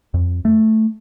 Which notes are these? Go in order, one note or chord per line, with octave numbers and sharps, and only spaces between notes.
F2
A3